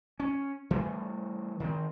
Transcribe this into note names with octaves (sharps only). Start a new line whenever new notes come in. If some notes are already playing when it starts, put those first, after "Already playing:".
C#4
E3 G3 A3
D#3 C4